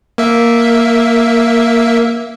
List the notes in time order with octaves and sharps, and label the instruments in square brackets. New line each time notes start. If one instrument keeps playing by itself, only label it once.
[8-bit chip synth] A#3 E5